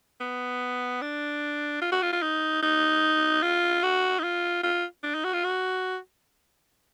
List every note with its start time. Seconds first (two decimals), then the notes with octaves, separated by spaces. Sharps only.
0.20 B3
1.02 D4
1.82 F4
1.92 F#4
2.02 F4
2.13 F4
2.22 D#4
2.63 D#4
3.43 F4
3.83 F#4
4.19 D#4
4.24 F4
4.64 F4
5.03 D4
5.14 D#4
5.24 F#4
5.33 F4
5.44 F#4